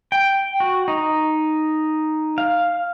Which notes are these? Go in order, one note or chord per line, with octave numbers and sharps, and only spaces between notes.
G5
F#4
D#4
F5